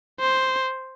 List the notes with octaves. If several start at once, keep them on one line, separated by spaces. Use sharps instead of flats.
C5